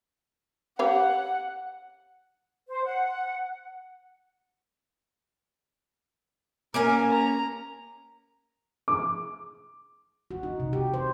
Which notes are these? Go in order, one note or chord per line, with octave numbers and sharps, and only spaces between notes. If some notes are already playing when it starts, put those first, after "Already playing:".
G4 C#5 F5 F#5
C5
F#5
A#3 C#4 A#4 G#5
A#5
D6
F#4
D#4
C3
G4
C5